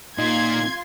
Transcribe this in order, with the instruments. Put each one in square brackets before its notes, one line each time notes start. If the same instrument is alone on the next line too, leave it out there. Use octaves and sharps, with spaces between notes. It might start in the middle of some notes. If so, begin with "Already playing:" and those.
[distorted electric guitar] A#2 [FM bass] D#4 [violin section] F4 C6 [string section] G#6